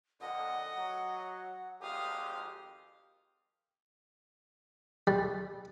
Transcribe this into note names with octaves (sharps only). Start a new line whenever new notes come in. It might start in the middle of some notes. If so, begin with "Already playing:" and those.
F2 A#2 D3 D#5 F#5
F#3
G#1 F2 G4 F5 D#6
G3